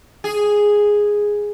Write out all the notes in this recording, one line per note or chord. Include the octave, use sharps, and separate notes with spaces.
G#4